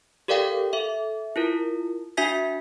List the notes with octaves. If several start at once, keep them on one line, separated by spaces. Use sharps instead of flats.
G4 A4 A#4 D5 F5 G5
A4 E5
E4 F4 A#4
D4 F#4 E5 G#5 G#6 B6